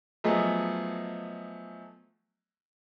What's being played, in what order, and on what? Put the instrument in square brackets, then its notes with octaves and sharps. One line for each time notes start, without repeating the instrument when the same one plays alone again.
[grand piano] F3 F#3 A3 B3 G#4 D#5